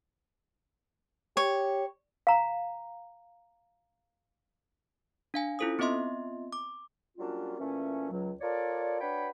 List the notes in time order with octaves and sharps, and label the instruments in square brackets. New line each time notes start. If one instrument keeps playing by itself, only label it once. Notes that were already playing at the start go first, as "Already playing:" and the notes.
[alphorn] G4 [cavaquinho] C#5
[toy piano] F5 A#5
[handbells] D4 F5 G#5
C#4 E4 F4 A4 C5 D#6
B3 C4 F4 D#5 E5 C6
D6
[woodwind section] F#3 G3 A#3 C#4 D4 F4
A#2 E3 A3 C#4
C#2 F#3
F4 A4 A#4 C#5 D5
D4 F#4 B4 C#5 G5 B5